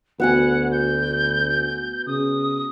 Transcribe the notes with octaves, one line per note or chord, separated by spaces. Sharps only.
D2 B3 F#4 F#5 G#5
G6
C#3 D#6